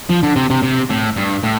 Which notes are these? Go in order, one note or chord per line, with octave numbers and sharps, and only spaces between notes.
F3
D3
C3
C3
C3
A2
G2
A2